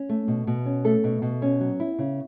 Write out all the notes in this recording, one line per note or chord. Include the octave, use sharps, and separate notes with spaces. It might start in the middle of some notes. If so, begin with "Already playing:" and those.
Already playing: C#4
A3
B2
B2
C#4
A3 A4
B2
B2
C#4
F#3
E4
C#3